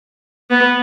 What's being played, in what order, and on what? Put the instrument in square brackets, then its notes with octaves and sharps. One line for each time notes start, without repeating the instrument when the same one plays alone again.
[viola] B3